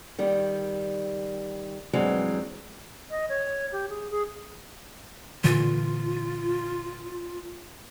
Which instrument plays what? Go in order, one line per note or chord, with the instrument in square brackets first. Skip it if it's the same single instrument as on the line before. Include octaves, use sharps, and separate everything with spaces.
[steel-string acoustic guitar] D#3 G3
G2 E3 F#3 G#3 C4
[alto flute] D#5
C#5
G4
G#4
G#4
[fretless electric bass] A#2 D3 E3 [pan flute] F4